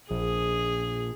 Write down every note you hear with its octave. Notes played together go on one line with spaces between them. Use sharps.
A#1 G#4